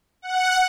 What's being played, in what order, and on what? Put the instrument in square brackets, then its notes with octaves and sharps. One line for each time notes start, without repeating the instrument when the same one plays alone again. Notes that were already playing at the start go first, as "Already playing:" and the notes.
[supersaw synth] F#5